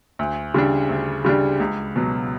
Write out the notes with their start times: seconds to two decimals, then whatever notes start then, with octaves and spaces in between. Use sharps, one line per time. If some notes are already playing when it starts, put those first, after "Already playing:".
0.19 D2
0.54 C#3 G3 D4
0.89 D2
1.25 C#3 G3 D4
1.60 C#2
1.96 B2 F#3